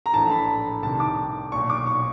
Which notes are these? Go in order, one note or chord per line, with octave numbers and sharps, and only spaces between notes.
A#5
A#1 A2 E3 A5
B5
C2 C3 D#3 A5
D6
B1 A#2 C#6
D6
C#6